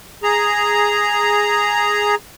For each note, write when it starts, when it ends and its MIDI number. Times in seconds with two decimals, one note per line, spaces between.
0.23 2.15 68
0.23 2.15 82